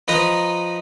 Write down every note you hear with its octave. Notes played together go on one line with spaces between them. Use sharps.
F3 D#4 B4 A#5